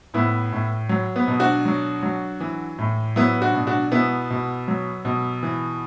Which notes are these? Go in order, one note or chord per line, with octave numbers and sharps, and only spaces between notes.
A2 B3 E4
A2
F#3
B3
B2
D4 F#4
F#3
F#3
E3
A2
F#3 B3 E4
D4 F#4
B2
D4 F#4
B2 B3 E4
B2
F#3
B2
E3